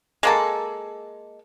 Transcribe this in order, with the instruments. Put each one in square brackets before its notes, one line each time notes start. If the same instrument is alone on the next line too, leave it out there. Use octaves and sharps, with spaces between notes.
[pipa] G#3 A#3 A4